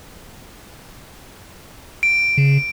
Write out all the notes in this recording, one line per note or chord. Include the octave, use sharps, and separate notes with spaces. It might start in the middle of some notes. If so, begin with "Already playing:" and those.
D7
C#3